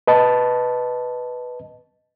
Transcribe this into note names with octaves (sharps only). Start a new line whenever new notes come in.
B4 D#5 A5